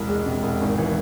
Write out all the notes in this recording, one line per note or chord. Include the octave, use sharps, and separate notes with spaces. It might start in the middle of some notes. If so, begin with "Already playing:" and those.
Already playing: E1 C2
G#3
C3
E1
G#1
E3